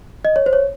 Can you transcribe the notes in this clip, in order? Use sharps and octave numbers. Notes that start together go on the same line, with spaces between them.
D#5
C#5
C5
C#5